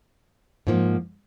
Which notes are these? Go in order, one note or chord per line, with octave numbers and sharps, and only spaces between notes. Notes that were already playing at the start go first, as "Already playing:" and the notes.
G#2 F3 A#3